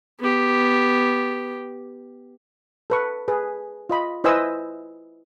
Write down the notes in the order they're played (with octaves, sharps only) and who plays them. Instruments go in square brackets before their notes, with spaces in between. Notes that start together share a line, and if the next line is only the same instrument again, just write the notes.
[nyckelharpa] B3 G4
[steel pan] A4 B4 C#6
G#4 B4
F4 D#5 B5
E4 B4 C5 D#5 G#5 E6